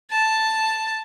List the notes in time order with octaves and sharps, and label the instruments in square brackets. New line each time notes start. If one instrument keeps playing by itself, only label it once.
[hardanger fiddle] A5